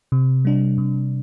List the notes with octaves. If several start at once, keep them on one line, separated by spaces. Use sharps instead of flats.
C3
G3 D4
C3